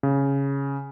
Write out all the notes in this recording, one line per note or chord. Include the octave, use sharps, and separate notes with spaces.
C#3